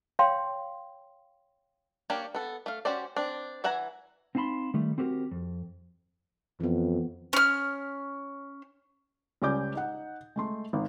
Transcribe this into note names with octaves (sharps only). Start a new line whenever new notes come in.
C#5 F5 G5 C6
A#3 D4 G4 C#5
B3 A4
A3 F5
C#4 F#4 G4 C5 D5
C4 D4
E3 E5 F#5 G#5 A#5
C4 D#4 F5 A5 B5 C6
D#3 G3 A3
C4 F#4 G4 A#4
F2
F2 E3 B3
C#4 F6
C#2 G3 C#4 D5 D6 G6
D#4 F#5
G#3 A3 C6
G#1